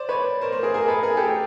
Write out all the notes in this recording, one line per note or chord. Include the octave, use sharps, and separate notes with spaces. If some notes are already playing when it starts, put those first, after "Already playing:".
Already playing: C5 D5
B4 C#5
A#4 C5
A#4 C5
G#4 A#4
G#4 A#4
A4 B4
G#4 A#4
G4 A4